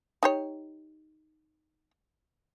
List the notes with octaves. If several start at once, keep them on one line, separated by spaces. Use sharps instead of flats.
D#4 G4 C#5